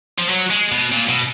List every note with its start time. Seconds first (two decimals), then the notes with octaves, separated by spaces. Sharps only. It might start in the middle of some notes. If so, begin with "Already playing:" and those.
0.18 F3
0.29 F#3
0.50 G#3
0.72 B2
0.93 A#2
1.09 B2